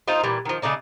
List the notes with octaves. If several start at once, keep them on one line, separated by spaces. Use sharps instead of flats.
D#4 F4 A#4 C5
A#2 E3 G3
D#3 F3
C#3 A3 D4 D#4